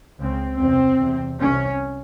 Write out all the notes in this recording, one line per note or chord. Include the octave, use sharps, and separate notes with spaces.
C#2 C#3 C4
E2 C3 C4
E2 C3
C2 C3 C#4